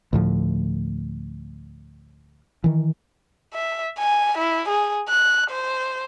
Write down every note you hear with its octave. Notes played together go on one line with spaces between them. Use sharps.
D2 A2 F3
D#3 E3
E5
G#5
E4
G#4
F#6
C5